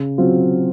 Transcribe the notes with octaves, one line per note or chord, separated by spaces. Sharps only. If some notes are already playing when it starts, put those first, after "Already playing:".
Already playing: C#3
F#3 C4 F4